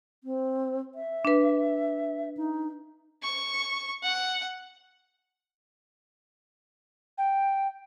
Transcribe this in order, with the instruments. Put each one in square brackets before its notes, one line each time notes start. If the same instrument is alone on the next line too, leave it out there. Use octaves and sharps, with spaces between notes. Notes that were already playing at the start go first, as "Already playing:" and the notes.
[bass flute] C4
E5
[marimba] D4 B4
[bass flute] D#4
[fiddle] C#6
F#5
[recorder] G5